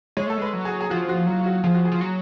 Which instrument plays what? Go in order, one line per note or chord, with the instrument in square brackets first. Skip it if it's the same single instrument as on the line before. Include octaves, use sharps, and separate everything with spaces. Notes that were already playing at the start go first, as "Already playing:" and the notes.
[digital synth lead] G#3 [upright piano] C#5
[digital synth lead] A3 [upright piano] A4
[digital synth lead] G#3 [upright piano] B4
[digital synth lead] F#3
[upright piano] G#4
G#4
[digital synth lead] F3 [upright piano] F#4
[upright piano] F#4
[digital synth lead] F#3 [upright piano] F4
[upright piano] F4
F#4
[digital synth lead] F3 [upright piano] G#4
[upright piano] F#4
G#4
[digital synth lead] F3
F#3